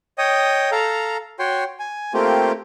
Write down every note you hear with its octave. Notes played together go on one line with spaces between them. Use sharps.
C#5 D#5 G5 D#6
A4 F5 A#5
F#4 C#5 G5 C6
G#5
A3 A#3 C4 F4 G4